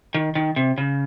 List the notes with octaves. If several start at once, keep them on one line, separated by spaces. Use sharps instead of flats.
D#3
D#3
C3
C#3